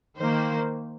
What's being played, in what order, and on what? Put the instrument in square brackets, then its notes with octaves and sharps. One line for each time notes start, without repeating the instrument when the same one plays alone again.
[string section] D#3 A#3 C5